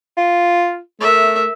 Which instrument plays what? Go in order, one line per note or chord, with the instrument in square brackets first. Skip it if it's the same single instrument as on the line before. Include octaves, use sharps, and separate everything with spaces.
[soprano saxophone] F4
[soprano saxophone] A3 [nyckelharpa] A#4 E5